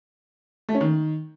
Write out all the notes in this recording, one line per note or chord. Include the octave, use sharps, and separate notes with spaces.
A3
C#4
D#3